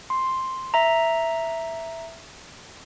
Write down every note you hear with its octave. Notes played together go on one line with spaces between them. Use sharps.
C6
E5 A#5